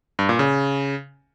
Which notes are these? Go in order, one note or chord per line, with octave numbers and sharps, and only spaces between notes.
G2
A#2
C#3